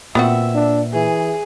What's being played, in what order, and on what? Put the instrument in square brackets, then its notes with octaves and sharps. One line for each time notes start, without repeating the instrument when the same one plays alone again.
[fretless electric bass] A#2 [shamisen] B3 C4 F#4 [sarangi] E5
[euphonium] D4
[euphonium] E3 [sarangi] G#4